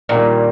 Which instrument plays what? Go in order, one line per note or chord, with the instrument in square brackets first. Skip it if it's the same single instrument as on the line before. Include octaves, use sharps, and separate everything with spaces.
[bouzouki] A#2 [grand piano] D#3 G3 A#3 D4 F4